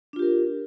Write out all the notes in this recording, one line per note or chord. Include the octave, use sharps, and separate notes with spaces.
D4 F4 G4 A#4